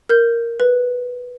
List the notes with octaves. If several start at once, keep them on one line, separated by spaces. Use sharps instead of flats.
A#4 G6
B4